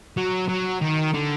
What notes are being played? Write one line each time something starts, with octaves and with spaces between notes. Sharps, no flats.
F#3
F#3
D#3
D3